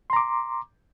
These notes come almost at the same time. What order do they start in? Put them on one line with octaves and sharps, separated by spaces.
C6 A#5 D6